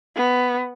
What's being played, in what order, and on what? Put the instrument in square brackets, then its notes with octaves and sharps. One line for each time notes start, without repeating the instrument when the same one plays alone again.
[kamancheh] B3